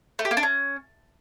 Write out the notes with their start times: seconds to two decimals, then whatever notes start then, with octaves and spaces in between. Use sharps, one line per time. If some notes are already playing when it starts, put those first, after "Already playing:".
0.19 A3
0.25 G4
0.31 A#3
0.37 D4
0.43 C#4